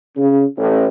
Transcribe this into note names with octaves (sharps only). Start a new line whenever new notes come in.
C#3
A1